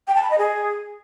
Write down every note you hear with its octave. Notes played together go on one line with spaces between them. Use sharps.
G5
A5
B5
D#5
G#4